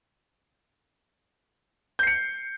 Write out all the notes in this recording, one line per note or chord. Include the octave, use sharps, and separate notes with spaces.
G6 C7 C#7